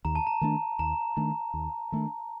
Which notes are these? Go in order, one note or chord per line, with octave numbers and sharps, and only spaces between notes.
D#2 A#5
A5
A#5
D#3 A3 D4
D#2 A#5
D#3 A3 D4
D#2
D#3 A3 D4